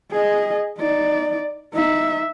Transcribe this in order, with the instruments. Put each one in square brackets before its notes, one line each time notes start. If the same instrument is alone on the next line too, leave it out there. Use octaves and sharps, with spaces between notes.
[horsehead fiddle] G#4 D#5
D#4 D5
D#4 E5